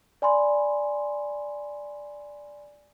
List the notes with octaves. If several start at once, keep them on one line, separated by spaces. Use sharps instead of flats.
D5 G#5 B5 C6